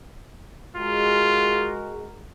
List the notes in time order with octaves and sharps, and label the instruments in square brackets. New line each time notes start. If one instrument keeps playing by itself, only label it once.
[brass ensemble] G#3 F#4 A#4 [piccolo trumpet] F4